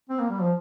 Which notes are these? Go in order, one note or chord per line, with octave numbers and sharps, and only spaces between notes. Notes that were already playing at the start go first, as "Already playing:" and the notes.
C4
A#3
G3
F3